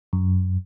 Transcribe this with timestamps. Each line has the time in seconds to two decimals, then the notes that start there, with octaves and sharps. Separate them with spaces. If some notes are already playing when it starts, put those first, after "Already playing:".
0.13 F#2